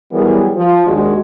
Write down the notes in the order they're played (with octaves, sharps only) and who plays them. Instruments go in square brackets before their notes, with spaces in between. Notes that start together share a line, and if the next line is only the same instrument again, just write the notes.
[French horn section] E3 F#3 G3 B3 G#4 A#4
F3
D#2 D#3 G#3 D4 F#4